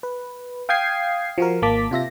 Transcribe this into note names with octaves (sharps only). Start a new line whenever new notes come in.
B4
F5 G5 D#6 G#6 C7
F3 F#4 A#4
G#1 A#3 A5 D6 B6
C3 F4 E5 A#6